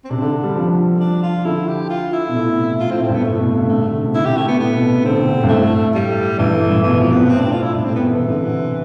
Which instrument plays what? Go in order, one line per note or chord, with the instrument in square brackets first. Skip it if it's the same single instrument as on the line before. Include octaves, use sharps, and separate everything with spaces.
[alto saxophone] C4
[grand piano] C3 [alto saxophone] D4
[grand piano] D3
G3
F3
[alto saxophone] D4
F4
[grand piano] D3 [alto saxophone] E4
[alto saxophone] G4
F4
E4
[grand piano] B2
A2
C3
[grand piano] A2 [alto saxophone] F4
[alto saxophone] C4
[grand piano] A2
[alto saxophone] C4
[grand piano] G2 [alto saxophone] B3
[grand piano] A2 [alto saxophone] A3
[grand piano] C3
B2
C3
[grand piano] D3 [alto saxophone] A3
[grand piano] C3
D3
C3
[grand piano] D3 [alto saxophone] E4
[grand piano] C3 [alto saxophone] G4
[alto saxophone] A3
B3
[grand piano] A2 [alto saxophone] B3
[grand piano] B2
C3
[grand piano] D3 [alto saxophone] C4
[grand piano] D3
C3
G2
[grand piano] A2 [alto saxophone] A3
[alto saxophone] G3
[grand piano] G2 [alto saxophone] E3
[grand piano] A2
G2
[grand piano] B2 [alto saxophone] E3
[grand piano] C3
[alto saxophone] F3
[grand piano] C3
[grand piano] B2 [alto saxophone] B3
[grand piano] A2 [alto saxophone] C4
[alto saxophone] D4
F4
E4
[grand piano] G2 [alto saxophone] D4
[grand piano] A2 [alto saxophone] C4
[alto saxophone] B3
[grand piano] B2 [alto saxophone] E3
[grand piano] C3
D3
C3